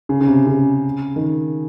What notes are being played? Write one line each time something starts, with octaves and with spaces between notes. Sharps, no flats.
C#3
C#3
C3
C#3
D#3